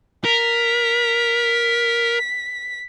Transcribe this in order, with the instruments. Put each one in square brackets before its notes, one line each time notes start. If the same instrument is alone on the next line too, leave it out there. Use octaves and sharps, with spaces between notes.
[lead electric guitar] A#4 [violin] B6